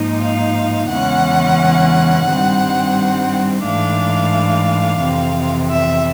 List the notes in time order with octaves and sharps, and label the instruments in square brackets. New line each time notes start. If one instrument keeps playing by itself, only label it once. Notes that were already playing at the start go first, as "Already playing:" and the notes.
Already playing: [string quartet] G#2 F3 A#3 D#4
F5
E2 C#3 E3 G#3 C#4 F#5
G2 D#3 G3 C4
G#2 E3 A3 D4 F5
F2 C3 E3
E5